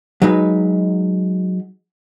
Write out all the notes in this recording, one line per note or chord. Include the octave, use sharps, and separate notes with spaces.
F#3 G#3 D#4 B4